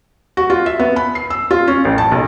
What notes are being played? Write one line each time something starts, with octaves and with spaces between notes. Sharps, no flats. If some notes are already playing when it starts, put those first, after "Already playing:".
F#4
F4
E5
B3
B5
C7
E6
F4
C#4
A1
A5
B1